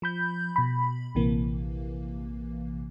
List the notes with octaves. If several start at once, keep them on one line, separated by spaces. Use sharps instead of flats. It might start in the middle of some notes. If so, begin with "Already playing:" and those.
F3 B5 G6
B2 B5
A#1 C3 E3 A#3